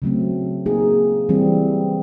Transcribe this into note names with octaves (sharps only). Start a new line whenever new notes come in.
C#3 F#3 A3 C4
A#3 D#4 G#4
E3 G3 C4